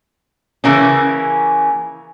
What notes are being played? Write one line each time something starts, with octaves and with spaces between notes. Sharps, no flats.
C#3 E3 A#3 C#4